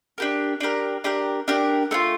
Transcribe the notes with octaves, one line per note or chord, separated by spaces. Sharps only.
D4 G4 A#4
D4 G4 A#4
D4 G4 A#4
D4 G4 A#4
A3 D4 F4